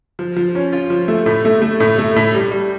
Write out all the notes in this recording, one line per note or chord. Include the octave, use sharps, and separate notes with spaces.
F3
F3
C#4
F4
F3
A3
A2
A3
A3
A2
A3
A2
G3
G3